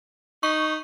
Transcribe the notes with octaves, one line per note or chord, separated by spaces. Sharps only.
D#4 C#6